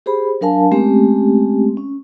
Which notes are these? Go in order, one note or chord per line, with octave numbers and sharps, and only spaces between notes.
G4 G#4 C5 B5
F#3 D4 A#4 F5 G#5 A5
G#3 A3 C4 C#4 G4
C#4